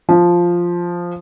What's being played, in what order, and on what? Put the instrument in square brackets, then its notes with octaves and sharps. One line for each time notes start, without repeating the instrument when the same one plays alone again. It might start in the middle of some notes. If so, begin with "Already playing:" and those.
[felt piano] F3